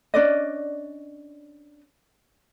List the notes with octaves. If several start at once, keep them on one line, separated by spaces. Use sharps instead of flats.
C#4 D4 D5 D#5